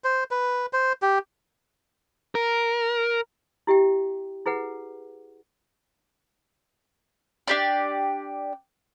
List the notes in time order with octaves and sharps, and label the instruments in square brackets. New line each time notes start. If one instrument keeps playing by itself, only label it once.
[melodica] C5
B4
C5
G4
[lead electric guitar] A#4
[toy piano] E4 G4 E5 G5
E4 G#4 B4 F#5
[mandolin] D4 G4 D5